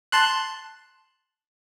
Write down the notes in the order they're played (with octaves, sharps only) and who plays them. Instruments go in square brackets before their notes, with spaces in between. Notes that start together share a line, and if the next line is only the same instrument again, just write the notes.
[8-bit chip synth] A5 C6 F#6